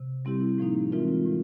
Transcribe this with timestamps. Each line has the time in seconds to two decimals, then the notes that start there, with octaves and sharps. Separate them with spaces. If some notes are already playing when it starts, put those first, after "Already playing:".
Already playing: C3
0.25 G3 C4 E4 G4
0.58 A2 F3 A#3 D#4
0.91 E3 G#3 C4 F4 A#4
1.25 A2 F3